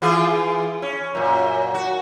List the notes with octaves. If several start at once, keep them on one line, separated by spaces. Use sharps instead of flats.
E3 F4 G#4
C#4
F#2 A#2
F#4